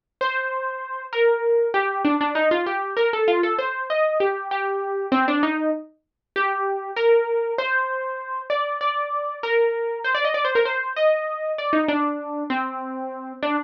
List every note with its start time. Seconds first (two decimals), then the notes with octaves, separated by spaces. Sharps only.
0.21 C5
1.13 A#4
1.74 G4
2.05 D4
2.21 D4
2.35 D#4
2.51 F4
2.66 G4
2.97 A#4
3.13 A4
3.28 F4
3.43 A4
3.59 C5
3.90 D#5
4.20 G4
4.51 G4
5.12 C4
5.28 D4
5.43 D#4
6.36 G4
6.96 A#4
7.58 C5
8.50 D5
8.81 D5
9.43 A#4
10.04 C5
10.15 D5
10.24 D#5
10.34 D5
10.45 C5
10.55 A#4
10.65 C5
10.96 D#5
11.58 D5
11.73 D#4
11.88 D4
12.50 C4
13.43 D4